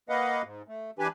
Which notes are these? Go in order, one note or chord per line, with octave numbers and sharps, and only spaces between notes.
A#3 B4 D#5 F5 F#5
G#2
A3
E3 D4 G4 B4 G#5